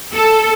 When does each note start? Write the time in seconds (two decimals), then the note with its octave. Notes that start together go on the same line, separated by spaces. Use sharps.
0.14 A4